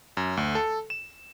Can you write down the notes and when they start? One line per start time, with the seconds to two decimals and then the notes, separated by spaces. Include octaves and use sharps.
0.17 F#2
0.37 D2
0.55 A4
0.90 E7